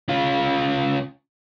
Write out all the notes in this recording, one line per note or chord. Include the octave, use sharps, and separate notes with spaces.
C#3 F4